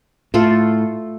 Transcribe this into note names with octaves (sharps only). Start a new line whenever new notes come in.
A2 A3 F4 A4